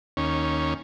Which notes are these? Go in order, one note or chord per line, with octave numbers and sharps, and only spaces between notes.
D#2 C#4